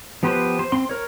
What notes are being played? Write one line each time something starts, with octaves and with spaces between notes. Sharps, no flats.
F3 B3 G4 B4 C5
C5
C4 C6
A#4 C#5